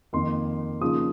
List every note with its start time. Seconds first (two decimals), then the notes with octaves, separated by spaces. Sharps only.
0.13 F2 D#3 A#3 C6
0.81 C#3 F3 A#3 D#4 D#6